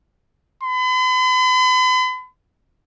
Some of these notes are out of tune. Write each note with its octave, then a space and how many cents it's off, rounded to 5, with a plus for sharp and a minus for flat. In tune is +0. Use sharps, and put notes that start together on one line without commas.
B5 +45